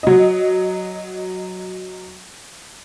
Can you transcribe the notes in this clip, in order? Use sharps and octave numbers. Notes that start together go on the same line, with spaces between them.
F#3 D#5